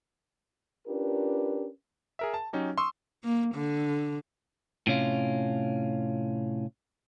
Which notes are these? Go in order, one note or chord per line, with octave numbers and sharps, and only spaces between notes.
C#4 D4 F4 G4 A#4 B4
G#4 A#4 E5
A5
F#3 C#4 D#4 G4
C6 C#6 D#6 E6
A#3
D3
A2 C3 C#4 F4